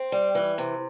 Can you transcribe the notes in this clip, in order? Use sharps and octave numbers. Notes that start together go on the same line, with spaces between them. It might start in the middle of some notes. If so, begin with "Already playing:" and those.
Already playing: C4
G3
E3
C3